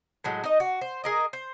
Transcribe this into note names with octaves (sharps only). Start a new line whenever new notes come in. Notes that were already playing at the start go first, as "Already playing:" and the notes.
A2 F#3 G#3
D#4 D#5
F#4
C5
G#4 A#4 D#5
C5